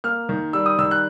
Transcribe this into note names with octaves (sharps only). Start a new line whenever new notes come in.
A#3 F6
D#3
G3 E6
D#6
D#3 E6
F#6